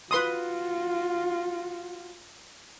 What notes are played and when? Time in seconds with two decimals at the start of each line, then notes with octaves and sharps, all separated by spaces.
0.11 F4 F#4 B4 C6 D#6